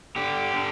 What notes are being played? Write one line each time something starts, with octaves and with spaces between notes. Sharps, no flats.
D3 G4
D3